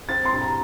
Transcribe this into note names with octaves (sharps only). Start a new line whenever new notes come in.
C4 A6
C6
G2
A#5